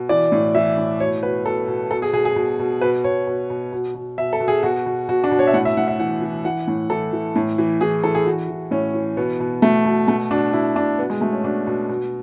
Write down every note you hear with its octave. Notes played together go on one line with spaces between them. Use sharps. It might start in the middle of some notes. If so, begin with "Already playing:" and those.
Already playing: B2
E3 D5
A2
E3 E5
A2
B2 C#5
B2 B4
B2 A4
B2
B2 A4
G#4
B2 G#4
G#4
B2
B2
B2 B4
B2 C#5
B2
B2
B2
B2
B2 E5
A4
B2
G#4
B2 F#4
B2
B2 F#4
D4
B2
C#5
E5
A2 F#5
E5
A2 F#5
E5
E3 F#5
E3
E3 F#5
A2
E3 A4
E3
A2
E3
E3 G#4
E3 A4
G#4
E3 F#4
E3
A2 C#4
E3
B2 B3
B2
B2 A3
B2
B2 A3
B2 D4
B2 E4
B2 D4
B2 B3
G#3
B2 A3
C#4
B2 D4
B2
B2